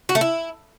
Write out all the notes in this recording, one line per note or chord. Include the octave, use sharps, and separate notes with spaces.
F#4
A3
E4